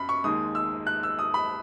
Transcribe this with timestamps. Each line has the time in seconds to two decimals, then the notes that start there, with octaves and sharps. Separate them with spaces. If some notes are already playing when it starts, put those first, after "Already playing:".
Already playing: F#2 B5
0.09 C#6
0.24 D#2 D#3 G#3 D#6
0.55 E6
0.87 F#6
1.03 E6
1.19 D#6
1.34 B5